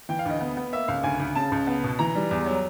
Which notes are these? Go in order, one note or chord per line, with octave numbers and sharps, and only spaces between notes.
E3 G5
F5
D2 D#5
B3
B3
A#3 E5
C#2 F5
D2 G#5
D2
C#3 A5
C#2
B3
B2
E3 A#5
G3
E2
F#3